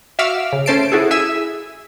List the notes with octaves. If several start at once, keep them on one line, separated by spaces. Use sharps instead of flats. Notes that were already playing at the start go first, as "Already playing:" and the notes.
F#4 E5 F5 D6 E6 F6
C#3
A3 C#4 C5 A5 C7 D7
E4 F#4 G#4 A4
E4 G#4 E5 G#5 E6